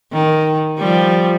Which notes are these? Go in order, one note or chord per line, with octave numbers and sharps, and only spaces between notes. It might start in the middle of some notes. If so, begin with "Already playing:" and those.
D#3
F3 G3